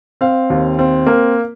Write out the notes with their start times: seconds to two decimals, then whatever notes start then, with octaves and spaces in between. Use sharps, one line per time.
0.21 C4 F5
0.50 D#2
0.79 C4
1.06 A#3